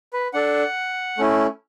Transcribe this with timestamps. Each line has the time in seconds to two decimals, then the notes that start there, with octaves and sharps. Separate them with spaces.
0.13 B4
0.33 D4 A4 F#5
1.18 A3 C#4 E4